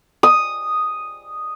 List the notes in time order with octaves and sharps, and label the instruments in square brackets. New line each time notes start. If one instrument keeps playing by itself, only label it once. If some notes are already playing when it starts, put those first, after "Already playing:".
[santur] D#6